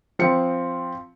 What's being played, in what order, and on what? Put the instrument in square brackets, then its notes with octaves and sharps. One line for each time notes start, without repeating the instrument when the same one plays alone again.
[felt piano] F3 C4 C#7